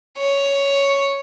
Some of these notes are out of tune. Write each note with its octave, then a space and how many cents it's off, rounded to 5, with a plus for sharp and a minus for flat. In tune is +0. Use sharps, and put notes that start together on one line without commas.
C#5 +5